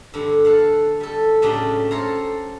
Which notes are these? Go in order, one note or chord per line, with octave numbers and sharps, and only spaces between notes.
G2 D3
A4 F5 F#5
G3 A4
A2 C#3 F#3 D4 G4
A4 C5 C#5 F5 A#5